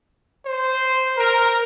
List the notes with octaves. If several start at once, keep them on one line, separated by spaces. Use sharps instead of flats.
C5
A#4